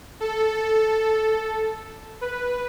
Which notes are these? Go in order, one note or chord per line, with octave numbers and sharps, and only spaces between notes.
A4
B4